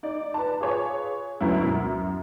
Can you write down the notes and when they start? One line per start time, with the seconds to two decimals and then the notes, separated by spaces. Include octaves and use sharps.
0.03 D#4 D5
0.34 B4 A5
0.60 F4 G#4 B4 C#5
1.40 D2 B2 F#3 C#4 E4
1.62 F#2